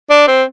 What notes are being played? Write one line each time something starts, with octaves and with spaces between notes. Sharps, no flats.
D4
C4